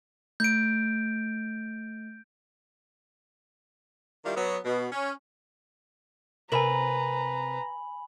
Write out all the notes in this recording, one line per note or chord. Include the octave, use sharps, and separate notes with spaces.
A3 G6 D7
D#3 G3 D4 E4 F4
F#3 B3
B2
C#4
C3 A#4 B4 E5 G#5 A#5 B5 F#7